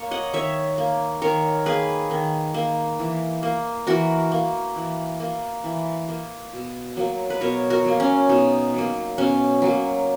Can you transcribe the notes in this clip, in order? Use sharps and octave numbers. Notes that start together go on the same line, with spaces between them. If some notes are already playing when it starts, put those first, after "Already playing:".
Already playing: A#3 C#5
D#5 F#5
D#3 C#5 E5
A#3
D#3 A#4 C#5
A#3 G#4 B4
D#3
A#3
E3
A#3
E3 F#4 A#4
A#3
E3
A#3
E3
A#3
B2
F#3 A#3
B4
B2 A#4 C#5
F#4 A#4
F#3 A#3
C#4
B2 D#4
F#3 A#3
B2 C#4
F#3 A#3